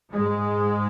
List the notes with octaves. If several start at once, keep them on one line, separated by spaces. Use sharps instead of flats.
G#2 G#3